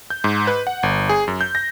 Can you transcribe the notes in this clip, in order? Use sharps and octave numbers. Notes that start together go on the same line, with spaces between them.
G6
G#2
B4
F#5
G1
G#4
F#2
G6
A#6